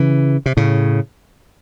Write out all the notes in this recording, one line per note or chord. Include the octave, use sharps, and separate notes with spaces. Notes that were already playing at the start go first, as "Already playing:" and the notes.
Already playing: C#3 E3
C3
A2 C#3